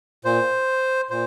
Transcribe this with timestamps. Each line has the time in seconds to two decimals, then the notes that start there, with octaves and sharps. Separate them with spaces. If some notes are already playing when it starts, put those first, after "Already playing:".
0.25 A#2 C5
1.10 A#2 C5